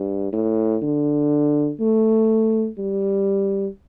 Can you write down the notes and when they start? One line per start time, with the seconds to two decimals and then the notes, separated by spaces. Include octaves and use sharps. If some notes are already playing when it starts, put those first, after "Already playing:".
Already playing: G2
0.33 A2
0.82 D3
1.80 A3
2.78 G3